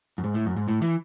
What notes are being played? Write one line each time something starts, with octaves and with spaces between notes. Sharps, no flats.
F#2
G#2
A2
F#2
G#2
A2
E3